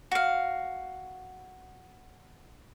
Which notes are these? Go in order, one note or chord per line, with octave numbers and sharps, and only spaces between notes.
F#4 F5